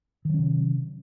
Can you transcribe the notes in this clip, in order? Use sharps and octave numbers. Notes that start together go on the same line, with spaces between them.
C3 D#3 F#3 C#4